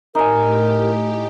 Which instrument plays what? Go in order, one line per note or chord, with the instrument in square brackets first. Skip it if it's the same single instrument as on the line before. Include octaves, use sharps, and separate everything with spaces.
[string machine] A2 G4 [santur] D#4 G#5 [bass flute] A#4